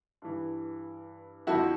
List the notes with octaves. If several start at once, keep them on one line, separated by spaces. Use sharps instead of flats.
G2 E3
F2 D3 F3 E4 F#4